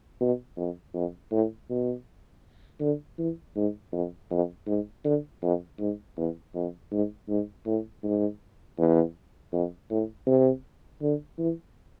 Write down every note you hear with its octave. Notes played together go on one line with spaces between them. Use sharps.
B2
F2
F2
A2
B2
D3
E3
G#2
F2
F2
G#2
D3
F2
G#2
E2
F2
G#2
G#2
A2
G#2
E2
F2
A2
C3
D3
E3